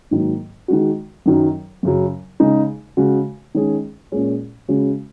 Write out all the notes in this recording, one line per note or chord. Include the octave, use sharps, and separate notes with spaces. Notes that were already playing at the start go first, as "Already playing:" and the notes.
G#2 D#3 F#3 A#3 D#4
D#3 G#3 F#4
F#2 D#3 F#3
F#2 C#3 F#3
C#3 G#3 D#4 G#4
C#3 G#3 F#4
D#3 G#3 C#4 G#4
A#2 G#3 C#4 G#4
C#3 G#3 C#4 F#4